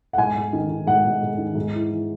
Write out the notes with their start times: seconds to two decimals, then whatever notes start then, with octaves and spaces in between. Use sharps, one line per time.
0.13 F#5
0.18 G#2 G#5
0.35 G#2
0.53 D#3
0.69 D#3
0.87 G#2 F#5
1.05 G#2
1.22 G#2
1.38 D#3
1.55 G#2
1.73 E3
1.90 E3